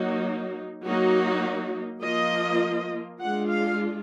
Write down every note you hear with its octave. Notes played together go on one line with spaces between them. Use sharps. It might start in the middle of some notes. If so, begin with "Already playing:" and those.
Already playing: F#3 A#3 D#4 F#4
F#3 A#3 D#4 F#4
F3 A#3 F4 D#5
G#3 D4 F4 F#5
F5